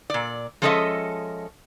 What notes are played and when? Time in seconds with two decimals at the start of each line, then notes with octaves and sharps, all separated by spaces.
0.10 A#2 D5
0.62 F3 G#3 C#4 A4 D#5 E5